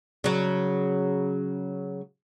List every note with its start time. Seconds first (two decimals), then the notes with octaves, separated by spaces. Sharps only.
0.24 C#3 F#3